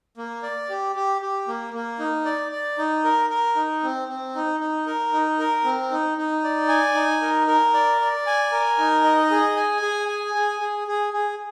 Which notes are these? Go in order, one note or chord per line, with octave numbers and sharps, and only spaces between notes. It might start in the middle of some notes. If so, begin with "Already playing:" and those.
A#3
D5
G4
G4
G4
A#3
A#3
D#4
D5
D5
D#4
A#4
A#4
D#4
C4
C4
D#4
D#4
A#4
D#4
A#4
C4
D#4
D#4
D5
G#5
D#4
A#4
A#4
D5
D5
G#5
A#4
D#4
D#5
G#4
G#5
G#4
G#5
G#4
G#4
G#4
G#4